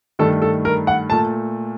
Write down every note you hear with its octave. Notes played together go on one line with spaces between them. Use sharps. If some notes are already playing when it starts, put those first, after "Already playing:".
G2 D#3 A3 A4
A4
A#4
F#5
A#2 A3 A5